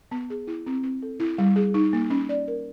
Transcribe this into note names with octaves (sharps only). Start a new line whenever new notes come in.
B3
G#4
E4
C4
C4
A4
E4
G3
G#4
D#4
A#3
C#4
D5
A#4